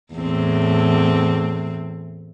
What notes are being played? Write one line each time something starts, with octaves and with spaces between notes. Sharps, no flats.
E2 A2 C4